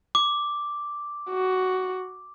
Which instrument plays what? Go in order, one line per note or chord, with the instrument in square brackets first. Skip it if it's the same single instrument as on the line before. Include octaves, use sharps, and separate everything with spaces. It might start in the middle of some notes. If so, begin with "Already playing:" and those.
[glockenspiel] D6
[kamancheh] F#4